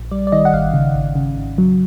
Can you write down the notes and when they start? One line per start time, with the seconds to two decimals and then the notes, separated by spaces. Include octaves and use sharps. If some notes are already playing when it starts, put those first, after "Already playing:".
Already playing: A#1
0.11 G3 D5
0.27 D5
0.32 D#3 D#5
0.45 F#5
0.53 G#1 F5
0.74 C#3
0.95 G#1
1.15 C#3
1.36 G#1
1.58 F#3